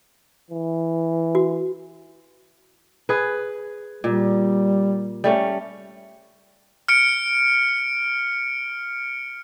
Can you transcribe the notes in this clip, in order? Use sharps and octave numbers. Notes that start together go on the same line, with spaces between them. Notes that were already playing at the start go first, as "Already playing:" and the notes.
E3
F#4
G#4 B4
A#2 G3
G3 A3 C#4
F6 C#7 D7